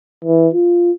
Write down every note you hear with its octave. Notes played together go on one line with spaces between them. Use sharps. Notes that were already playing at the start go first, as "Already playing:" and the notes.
E3
F4